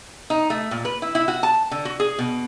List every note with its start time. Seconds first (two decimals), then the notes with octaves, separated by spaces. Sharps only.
0.30 D#4
0.50 A3
0.71 A#2
0.85 B4
1.02 E4
1.15 E4
1.28 F#4
1.43 A5
1.71 D3
1.85 F#4
2.00 G#4
2.18 B2